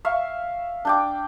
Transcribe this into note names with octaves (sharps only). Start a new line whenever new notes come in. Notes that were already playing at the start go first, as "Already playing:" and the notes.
E5 F5 C#6
D4 G5 D6